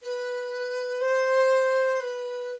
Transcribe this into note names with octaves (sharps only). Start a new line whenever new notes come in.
B4
C5
B4